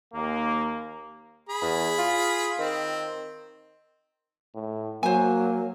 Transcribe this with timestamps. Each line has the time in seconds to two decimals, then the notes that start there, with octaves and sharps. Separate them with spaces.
0.14 D#2 A#3
1.49 G#4 B5
1.62 E2
1.98 F4
2.59 D#3 C4
4.55 A2
5.03 F#3 A#3 C5 G#5